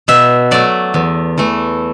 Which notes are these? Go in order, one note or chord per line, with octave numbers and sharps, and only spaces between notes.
B2 E5
F#3 A3 D5
E2
E3 A3